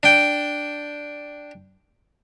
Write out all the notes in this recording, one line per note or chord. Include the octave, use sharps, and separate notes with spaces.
D4 G5